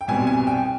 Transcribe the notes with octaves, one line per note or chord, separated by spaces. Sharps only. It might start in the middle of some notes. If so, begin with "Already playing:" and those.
G5
C2 B2 G3 C4 G#5
G#5
G5